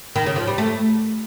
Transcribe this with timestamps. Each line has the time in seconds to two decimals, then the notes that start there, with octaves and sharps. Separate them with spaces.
0.16 D#3
0.26 C#3
0.36 F3
0.47 G3
0.58 A3